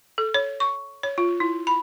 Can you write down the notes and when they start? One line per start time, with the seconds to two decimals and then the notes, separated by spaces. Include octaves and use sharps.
0.18 A4
0.34 C#5
0.60 C#6
1.03 C#5
1.18 F4
1.40 E4
1.67 B5